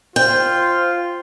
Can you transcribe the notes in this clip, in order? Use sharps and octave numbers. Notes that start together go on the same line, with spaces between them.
F4 C5 G5